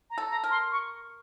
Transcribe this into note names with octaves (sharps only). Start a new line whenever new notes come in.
A#5
A4
A#5
A#4
C6
C#6